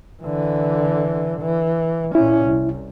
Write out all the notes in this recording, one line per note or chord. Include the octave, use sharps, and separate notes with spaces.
D3 E3
E3
A#2 C#4 E4
C2